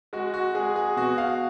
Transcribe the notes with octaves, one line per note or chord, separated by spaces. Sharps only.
G#3 F#4
F#4
G#3 G#4
G#4
B2 F#4
F5